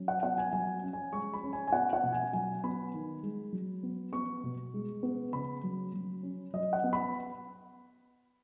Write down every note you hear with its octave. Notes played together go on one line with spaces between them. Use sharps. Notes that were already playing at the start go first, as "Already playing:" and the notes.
Already playing: F#3 C#4
F#5
B3 F#5
G#5
F#3 G#5
C#4
G#5
G#3 C#6
B5
C#4
G#5
G#5
B3 F#5
F#5
B2
G#5
F#3 G#5
B3 B5
D#3
G#3
F#3
B3
B3 C#6
B2
G#3
B3
C#3 B5
F#3
F#3
C#4
F#3 D#5
F#5
B3
B5